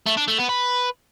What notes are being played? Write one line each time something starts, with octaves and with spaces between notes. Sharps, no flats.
A3
D4
A3
B3
B4